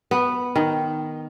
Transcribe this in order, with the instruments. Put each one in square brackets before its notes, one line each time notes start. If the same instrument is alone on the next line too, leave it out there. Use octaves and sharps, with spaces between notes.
[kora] B3
D#3